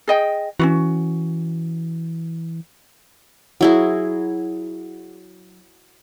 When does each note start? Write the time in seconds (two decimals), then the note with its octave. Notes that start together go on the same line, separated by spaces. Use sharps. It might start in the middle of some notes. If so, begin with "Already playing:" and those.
0.08 G#4 D#5 G5
0.60 E3 C#4 F4 F#4
3.61 F#3 E4 G#4